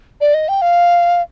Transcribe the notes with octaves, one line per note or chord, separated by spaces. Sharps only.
D5
D#5
G5
F5